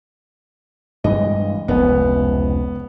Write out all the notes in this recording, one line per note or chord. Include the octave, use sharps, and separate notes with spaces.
G2 E3 G#3 D#5
F1 C#2 B3